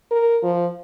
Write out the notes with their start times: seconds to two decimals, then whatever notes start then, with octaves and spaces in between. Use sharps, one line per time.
0.11 A#4
0.43 F3